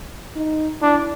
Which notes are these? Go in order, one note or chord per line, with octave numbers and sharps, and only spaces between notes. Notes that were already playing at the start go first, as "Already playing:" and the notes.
D#4
D4 E4